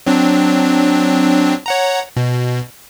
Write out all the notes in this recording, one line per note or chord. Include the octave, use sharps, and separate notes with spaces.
F#3 C4 D4
C#5 F#5 A#5
B2